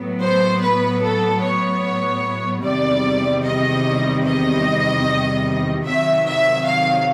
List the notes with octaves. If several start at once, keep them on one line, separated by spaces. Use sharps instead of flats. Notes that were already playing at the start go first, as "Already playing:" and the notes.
Already playing: A2 F#3 B3
C5
B4
A4
C#5
E2 C3 D#3 G3 D5
D#5
D#5
F2 C3 D#3 F#3 E5
E5
F5